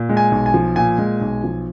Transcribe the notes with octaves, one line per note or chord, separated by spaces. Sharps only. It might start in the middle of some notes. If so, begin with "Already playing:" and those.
Already playing: A#2
G#3
G#5
B1
G#5
F3
A#2 G#5
G#3
B1
F3